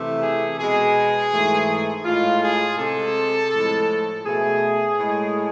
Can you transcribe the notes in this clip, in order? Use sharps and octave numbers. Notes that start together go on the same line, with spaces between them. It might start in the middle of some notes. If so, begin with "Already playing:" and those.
Already playing: C3 E3 A3
G#4
B2 G#3 G#4
G#2 E3 A3
A2 G#3 F4
G#4
C3 G#3 A4
A2 F3 G#3
B2 A3 G#4
A2 G#3